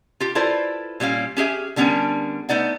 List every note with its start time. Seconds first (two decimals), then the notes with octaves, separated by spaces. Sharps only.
0.20 F4 G4
0.35 E4 F4 A4 B4 C5 D5
1.00 A#2 G3 C#4 F5
1.37 C#4 G4 G#4 E5
1.76 D3 G3 B3 C#4 D4 A#4
2.49 A3 B3 D#4 D5 F#5